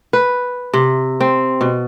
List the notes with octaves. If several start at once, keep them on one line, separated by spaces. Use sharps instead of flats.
B4
C3
C4
B2